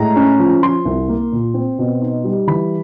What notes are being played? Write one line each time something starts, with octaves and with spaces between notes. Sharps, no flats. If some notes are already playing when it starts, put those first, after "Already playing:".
Already playing: A2 G#3 A#5
C#4
F3
F3 C6
C2
A#3
A#2
C4
B2
D#4
G3
E3 B5